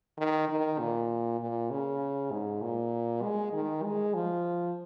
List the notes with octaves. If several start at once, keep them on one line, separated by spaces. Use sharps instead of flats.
D#3
D#3
A#2
A#2
C#3
G#2
A#2
G#3
D#3
G#3
F3